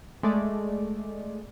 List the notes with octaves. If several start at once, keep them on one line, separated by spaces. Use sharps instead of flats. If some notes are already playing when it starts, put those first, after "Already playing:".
G#3 A3 D5